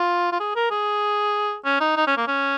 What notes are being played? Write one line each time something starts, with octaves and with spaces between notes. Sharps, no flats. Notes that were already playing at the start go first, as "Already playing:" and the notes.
Already playing: F4
F4
G#4
A#4
G#4
C#4
D#4
D#4
C#4
A#3
C#4